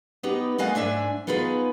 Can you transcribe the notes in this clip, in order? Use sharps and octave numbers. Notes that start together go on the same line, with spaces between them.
B3 D#4 G4 B4
G#3 A3 D#5 F5 F#5 G#5
G#2 D4 E5 G#5
B3 D#4 F4 G#4 B4